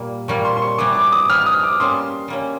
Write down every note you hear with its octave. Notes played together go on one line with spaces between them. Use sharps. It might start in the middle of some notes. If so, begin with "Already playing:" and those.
Already playing: A#2 G3 A#3
A#2 G3 A#3 C#6
C6
C6
C#6
G3 B3 E4 G#4 D6
D6
D#6
G3 B3 E4 G#4 F6
D#6
D6
G3 A#3 C#4 C6
G3 A#3 C#4